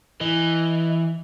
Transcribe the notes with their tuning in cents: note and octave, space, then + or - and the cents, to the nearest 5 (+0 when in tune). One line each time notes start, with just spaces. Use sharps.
E3 +0 D#5 +0